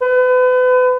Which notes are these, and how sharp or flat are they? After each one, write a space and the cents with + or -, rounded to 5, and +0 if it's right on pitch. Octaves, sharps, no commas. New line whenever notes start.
B4 +35